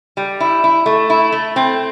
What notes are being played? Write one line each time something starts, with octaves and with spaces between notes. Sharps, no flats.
G3
E4
E4
A3
E4
A3
C4